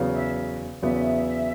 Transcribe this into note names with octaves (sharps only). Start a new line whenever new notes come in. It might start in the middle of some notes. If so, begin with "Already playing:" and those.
Already playing: E2 C#3 F#3 B3
E5
E2 C#3 F#3 B3 E5